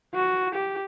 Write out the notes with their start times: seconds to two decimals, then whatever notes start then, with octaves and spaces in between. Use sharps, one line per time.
0.15 F#4
0.55 G4